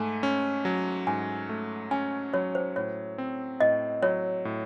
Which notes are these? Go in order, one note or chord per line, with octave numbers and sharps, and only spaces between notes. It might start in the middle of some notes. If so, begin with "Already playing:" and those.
Already playing: G#2 A3 G#5
C#4
F#3
G#2 G#5
A3
C#4 G#5
F#3 C#5
C5
A2 C#5
C4
A2 D#5
F#3 C#5
A2